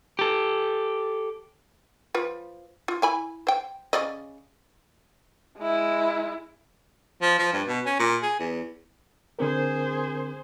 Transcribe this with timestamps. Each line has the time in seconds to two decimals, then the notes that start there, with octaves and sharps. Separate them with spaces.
0.19 G4 A4
2.14 F3 F4 B4
2.88 F4
3.02 E4 G#5 B5
3.47 C5 G5
3.93 C#3 D5 D#5
5.59 G#3 E4
7.22 F3
7.39 F3
7.53 G2
7.67 B2
7.86 C#4
8.00 A#2
8.23 G#4
8.40 E2
9.39 D3 C4 G#4 A#4 C5